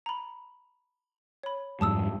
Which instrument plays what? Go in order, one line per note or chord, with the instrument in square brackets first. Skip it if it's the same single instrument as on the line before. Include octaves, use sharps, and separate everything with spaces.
[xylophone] A#5 B5
C#5 B5
[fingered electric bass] F2 G#2 G3 [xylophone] A5 D#6 E6